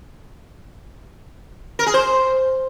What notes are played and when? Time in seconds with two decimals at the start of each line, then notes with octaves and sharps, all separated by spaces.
1.79 A#4
1.86 G#4
1.94 C5